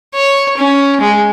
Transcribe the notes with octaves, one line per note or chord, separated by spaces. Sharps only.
C#5
C#4
G#3